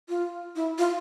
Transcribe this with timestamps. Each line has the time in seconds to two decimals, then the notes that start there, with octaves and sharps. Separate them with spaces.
0.09 F4
0.56 E4
0.78 F4